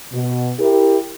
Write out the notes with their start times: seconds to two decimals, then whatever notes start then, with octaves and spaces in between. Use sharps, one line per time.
0.13 B2
0.60 E4 G4 A#4